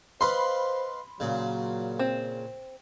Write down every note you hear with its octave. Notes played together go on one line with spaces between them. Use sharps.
B4 C5 D#5 F5 B5 C6
A#2 C#3 F#3
C4